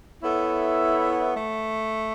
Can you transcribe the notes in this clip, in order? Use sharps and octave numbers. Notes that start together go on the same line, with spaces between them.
B3 E4 A4 C#5 E5
A3